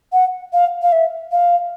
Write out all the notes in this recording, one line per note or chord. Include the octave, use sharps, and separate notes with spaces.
F#5
F5
F5
E5
F5